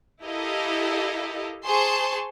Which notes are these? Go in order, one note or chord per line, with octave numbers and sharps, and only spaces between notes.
E4 G4 A4 A#4 D#5 F5
G#4 C5 A5 C6 C#6